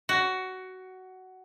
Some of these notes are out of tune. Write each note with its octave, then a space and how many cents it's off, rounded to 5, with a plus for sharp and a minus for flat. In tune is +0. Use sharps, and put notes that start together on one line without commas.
F#4 +15